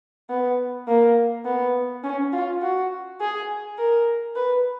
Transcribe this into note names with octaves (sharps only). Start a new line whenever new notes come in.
B3
A#3
B3
C#4
F4
F#4
G#4
A#4
B4